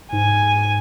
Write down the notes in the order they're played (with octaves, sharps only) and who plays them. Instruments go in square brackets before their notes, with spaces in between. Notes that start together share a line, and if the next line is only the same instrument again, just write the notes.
[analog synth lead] G#2 [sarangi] G#5